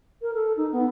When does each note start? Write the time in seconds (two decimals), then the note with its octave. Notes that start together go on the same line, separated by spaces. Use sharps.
0.22 A#4
0.34 A4
0.57 D#4
0.72 B3